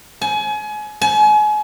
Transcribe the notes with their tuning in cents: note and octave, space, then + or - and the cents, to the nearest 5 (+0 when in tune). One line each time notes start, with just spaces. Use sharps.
G#5 +30
G#5 +35